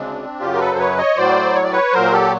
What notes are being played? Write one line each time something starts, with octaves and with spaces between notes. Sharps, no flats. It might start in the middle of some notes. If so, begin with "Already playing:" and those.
Already playing: D2 C#3 G#3 C4 D4
F#2 C#3 F#3 F4 G4
A#4
A4 B4
C5
B4 C#5
C#5 D#5
A2 F#3 C5 D5
C#5
D5
B4 C#5
A#2 F#3 A#4 C5
G4 A4